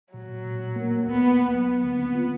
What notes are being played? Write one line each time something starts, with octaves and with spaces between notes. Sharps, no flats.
A#2 F#3
A#2
A#2
A#2
A#3
A#3
D2 B3
A#3
A#3
F#3 B3
D2
D3
C4
F4